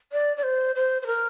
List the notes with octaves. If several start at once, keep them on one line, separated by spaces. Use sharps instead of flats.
D5
D5
C5
C5
C5
A#4